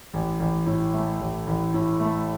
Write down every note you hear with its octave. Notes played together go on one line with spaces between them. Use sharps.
A1
A1
A2
A3
A1
A1
A2
A3